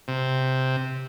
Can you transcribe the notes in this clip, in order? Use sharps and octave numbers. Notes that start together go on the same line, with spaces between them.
C3